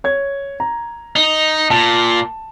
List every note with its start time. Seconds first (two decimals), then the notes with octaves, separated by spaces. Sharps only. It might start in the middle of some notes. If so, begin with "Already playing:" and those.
0.04 C#5 G#6
0.60 A#5
1.16 D#4
1.71 A#2 A5